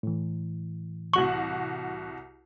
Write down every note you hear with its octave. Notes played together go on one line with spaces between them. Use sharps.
A2 E3
C2 F#4 C#6 F#7